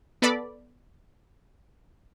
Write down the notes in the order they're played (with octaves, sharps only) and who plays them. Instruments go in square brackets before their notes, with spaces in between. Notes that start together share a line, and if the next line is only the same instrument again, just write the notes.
[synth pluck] B3 A4 D5 B5